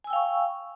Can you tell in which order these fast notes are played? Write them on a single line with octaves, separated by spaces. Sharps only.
G#5 E6 G5 F5 C#6